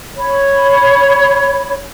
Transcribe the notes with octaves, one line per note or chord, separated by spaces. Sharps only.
C#5 B5